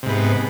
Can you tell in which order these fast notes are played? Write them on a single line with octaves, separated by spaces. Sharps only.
C3 G#2 B3